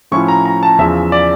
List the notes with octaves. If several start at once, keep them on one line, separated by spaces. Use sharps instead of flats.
A2 F3 C#4 E4 C#6
A#5
A#5
A5
E2 C#3 F3 E5
D5